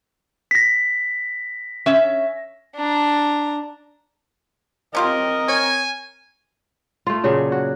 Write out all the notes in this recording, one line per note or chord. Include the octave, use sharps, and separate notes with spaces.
A#6 B6
C#4 E5
D4 A#5
C4 C#4 F4 G4 A#4 D#5
C#5 G#5
A3 F4
A#2 C#3 F#3 G#4
F#4